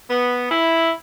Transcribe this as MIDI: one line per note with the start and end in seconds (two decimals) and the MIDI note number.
0.10 0.48 59
0.51 0.91 64